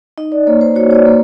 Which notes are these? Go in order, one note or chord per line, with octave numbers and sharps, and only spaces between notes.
D#4 D#5
D5
A#3 C#5
C5
F#4 C#5
C#5
D5
A#3